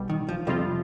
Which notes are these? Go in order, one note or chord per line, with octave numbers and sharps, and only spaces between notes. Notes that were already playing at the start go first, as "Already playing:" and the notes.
Already playing: B1 B2 G3
D#3
F3
F2 C3 F3 G3 C4 F4